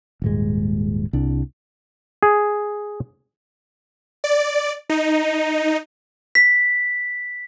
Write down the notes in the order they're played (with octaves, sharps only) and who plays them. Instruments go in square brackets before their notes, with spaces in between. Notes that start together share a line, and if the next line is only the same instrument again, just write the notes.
[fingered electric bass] D#1 G#2 G#3
C2 D4
[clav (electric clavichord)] G#4
[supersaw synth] D5
D#4
[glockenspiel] B6